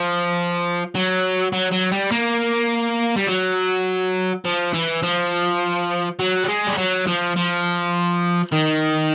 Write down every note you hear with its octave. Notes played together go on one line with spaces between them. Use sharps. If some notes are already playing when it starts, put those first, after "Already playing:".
Already playing: F3
F#3
F#3
F#3
G3
A#3
G3
F#3
F3
E3
F3
F#3
G3
G#3
G3
F#3
F3
F3
D#3